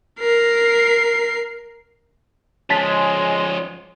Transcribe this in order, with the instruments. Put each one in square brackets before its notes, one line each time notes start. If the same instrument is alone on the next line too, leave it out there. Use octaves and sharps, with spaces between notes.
[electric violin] A#4 C7
[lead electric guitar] F3 C#4 [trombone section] G#3 [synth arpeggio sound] A5 A6 B6